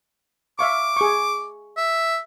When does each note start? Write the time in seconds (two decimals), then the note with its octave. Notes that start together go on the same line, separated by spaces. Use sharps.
0.59 E5 F5 C#6 D6
0.96 G#4 C#6
1.77 E5